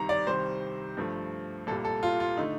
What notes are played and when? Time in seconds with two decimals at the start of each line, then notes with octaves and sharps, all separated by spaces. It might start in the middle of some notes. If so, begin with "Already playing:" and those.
Already playing: C2 C3 D#3 G3 A#5
0.09 D5
0.27 C2 C3 D#3 G3 C5
0.97 G2 F3 A3
1.67 C2 A#2 G3 A4
1.85 A4
2.03 F4
2.20 F4
2.37 D3 A3 D#4